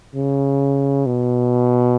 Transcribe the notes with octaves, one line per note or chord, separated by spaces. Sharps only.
C#3
B2